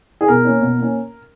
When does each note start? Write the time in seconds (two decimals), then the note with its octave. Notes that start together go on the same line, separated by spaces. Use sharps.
0.21 G#4
0.28 B2 A#4
0.45 A#3 C#4
0.61 B2
0.78 A#3 C#4